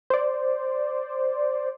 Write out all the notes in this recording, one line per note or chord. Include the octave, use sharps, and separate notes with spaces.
C5 D5